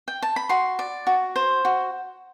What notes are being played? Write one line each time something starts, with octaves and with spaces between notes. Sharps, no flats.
G5
A5
B5
F#4 C6
D5
F#4
C5
F#4